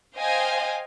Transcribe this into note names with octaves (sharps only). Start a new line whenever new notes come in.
C5 D#5 F5 G5 G#5